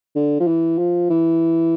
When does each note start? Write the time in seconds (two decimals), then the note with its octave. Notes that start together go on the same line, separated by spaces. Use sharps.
0.16 D3
0.40 F3
0.47 E3
0.78 F3
1.10 E3